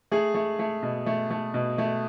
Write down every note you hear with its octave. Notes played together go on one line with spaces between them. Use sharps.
A3 G#4
A3
A3
B2
A3
A3
B2
A3